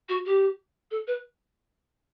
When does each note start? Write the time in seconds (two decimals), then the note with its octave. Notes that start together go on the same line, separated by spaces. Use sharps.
0.08 F#4
0.25 G4
0.91 A4
1.07 B4